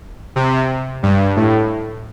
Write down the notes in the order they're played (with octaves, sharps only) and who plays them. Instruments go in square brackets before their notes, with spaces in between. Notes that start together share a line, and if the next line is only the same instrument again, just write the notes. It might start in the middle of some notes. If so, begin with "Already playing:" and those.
[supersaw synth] C3
G2
A2